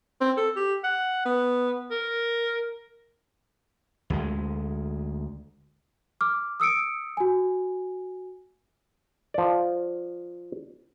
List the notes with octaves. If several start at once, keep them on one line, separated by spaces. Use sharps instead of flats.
C4
A4
G4
F#5
B3
A#4
D2 G#3
D6 F6
D#6 E6 C#7 D7
F#4 G#5
F3 D5